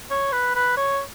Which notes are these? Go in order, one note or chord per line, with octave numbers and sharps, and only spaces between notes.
C#5
B4
B4
C#5